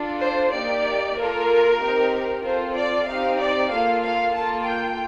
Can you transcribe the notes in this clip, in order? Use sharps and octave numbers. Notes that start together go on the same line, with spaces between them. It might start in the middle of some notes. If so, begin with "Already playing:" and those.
Already playing: D4 F4 A4
C5
A#3 D#4 G4 D5
A#3 F4 A4 A#4
C4 D#4 G4
C4 F4 A4 C5
D5
C4 D#4 G4 F5
D5
A#3 F4 A4 F5
F5
A#3 F4 A4 A5
G5